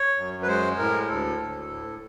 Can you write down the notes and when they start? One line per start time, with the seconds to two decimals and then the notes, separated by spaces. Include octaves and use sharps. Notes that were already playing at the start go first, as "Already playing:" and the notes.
Already playing: C#5
0.17 F#2
0.43 B4
0.47 G#3 C5
0.78 A2 A#4
1.09 D2 A4
1.40 D2
1.70 A2